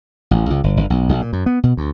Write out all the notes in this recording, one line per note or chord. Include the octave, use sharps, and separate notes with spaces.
A1
C#2
G1
G1
B1
B1
A#2
F#2
B3
B2
D2